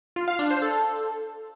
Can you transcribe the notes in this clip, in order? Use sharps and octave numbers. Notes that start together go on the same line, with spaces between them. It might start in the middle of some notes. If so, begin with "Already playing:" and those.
F4
F5
D4
C5
A4